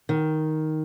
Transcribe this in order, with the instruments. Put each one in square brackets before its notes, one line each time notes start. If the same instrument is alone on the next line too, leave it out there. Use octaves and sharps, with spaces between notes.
[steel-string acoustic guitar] D#3